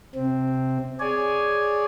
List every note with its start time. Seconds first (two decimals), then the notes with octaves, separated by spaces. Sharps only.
0.15 C3 C4
1.00 G#4 C#5 D5 G#5